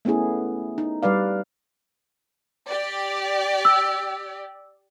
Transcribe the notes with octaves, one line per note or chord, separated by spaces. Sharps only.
A3 B3 C#4 E4 G#4
D#4
G3 B4 D5 F5
G4 D5
E6